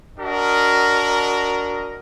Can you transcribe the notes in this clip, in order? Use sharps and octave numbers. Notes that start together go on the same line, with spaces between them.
D4 F#4 A#4 D#5